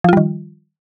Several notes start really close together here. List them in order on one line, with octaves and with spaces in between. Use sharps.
F3 F4 G3 D#3